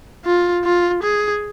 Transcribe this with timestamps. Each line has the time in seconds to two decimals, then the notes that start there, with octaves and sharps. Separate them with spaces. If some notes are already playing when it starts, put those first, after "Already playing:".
0.25 F4
0.64 F4
1.03 G#4